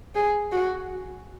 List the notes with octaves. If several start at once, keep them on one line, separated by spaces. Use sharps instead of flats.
G#4
F#4